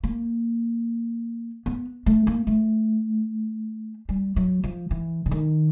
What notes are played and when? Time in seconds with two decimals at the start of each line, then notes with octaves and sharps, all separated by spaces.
0.04 A#3
1.66 B3
2.06 A3
2.27 A#3
2.47 A3
4.09 G3
4.36 F#3
4.64 F3
4.91 E3
5.26 D3
5.31 D#3